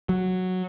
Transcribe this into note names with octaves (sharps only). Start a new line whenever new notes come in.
F#3